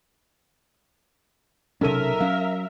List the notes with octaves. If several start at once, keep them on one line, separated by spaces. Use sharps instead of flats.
B1 C3 C#4 A4 A#4 E5 D#7
F#3 C#4 F5